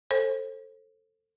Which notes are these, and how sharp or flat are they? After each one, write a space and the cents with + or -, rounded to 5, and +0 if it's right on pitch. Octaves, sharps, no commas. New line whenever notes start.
A4 +15 C5 +30